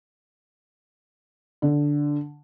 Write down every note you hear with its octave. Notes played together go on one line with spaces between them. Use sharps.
D3